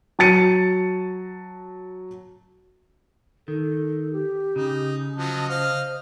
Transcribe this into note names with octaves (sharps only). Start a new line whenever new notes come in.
F#3 A5 A6 C#7 D#7
D#3 A4
G4
C#3 D#4
F3 F#3 D#5 A5
C5 D#5 F5